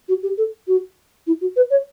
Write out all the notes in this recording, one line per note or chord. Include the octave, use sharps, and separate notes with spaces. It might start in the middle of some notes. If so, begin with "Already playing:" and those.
F#4
G4
A4
F#4
E4
F#4
B4
C#5